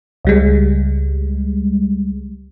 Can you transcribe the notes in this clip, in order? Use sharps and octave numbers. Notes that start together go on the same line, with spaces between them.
C#2 G3 G#3